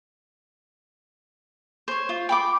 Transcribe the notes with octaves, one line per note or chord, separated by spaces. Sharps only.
C5 C#5
F4
G5 B5 D6